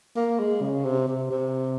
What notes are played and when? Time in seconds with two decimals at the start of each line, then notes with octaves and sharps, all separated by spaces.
0.16 A#3
0.39 G#3
0.61 C#3
0.84 C3
1.07 C3
1.30 C3